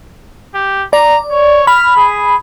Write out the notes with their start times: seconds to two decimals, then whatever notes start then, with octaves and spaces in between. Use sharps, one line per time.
0.54 G4
0.93 D5 A#5
1.31 C#5
1.67 B5 F6
1.96 G#4